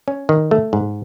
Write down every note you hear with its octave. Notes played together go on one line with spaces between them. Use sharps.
C#4
D#3
A3
G#2